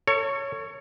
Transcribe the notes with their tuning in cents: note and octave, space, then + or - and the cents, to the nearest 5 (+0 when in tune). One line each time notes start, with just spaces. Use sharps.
A4 +45 C#5 +0